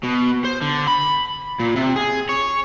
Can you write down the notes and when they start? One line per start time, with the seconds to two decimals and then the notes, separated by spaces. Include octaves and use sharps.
0.03 B2
0.44 C5
0.62 D3
0.87 B5
1.59 A#2
1.76 C3
1.96 G#4
2.29 C#5